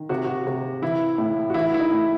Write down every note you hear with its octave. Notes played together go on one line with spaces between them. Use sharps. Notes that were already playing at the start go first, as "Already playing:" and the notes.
Already playing: D#3
C3 F#4
F#4
C3
E3 E4
A2
F#4
E3 E4
E4
D#4
A2